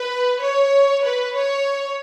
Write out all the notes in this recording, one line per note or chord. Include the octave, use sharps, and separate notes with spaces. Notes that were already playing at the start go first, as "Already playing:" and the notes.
Already playing: B4
C#5
B4
C#5